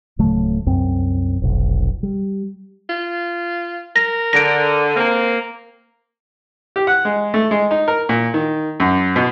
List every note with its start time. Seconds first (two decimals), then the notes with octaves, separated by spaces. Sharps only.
0.19 D1 C#3 F#3 A3
0.66 C2 F#2 C4
1.42 F1 B1
2.03 G3
2.89 F4
3.96 A#4 A#6
4.33 D3 A#6 D7
4.96 A#3 C4
6.76 G4
6.87 F#5
7.05 G#3
7.34 A3
7.51 G#3
7.71 D#4
7.88 A#4
8.09 A#2
8.34 D#3
8.80 F#2
9.16 B2